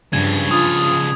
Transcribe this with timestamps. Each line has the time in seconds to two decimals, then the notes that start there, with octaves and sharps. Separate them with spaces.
0.13 G2 C#3 F3 G#6
0.51 F4 D#6